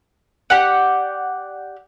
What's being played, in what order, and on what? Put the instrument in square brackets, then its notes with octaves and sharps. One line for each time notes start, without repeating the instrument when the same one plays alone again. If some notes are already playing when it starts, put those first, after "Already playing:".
[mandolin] G4 D5 F#5